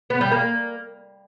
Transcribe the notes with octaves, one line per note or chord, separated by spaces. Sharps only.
B3
G3
A#3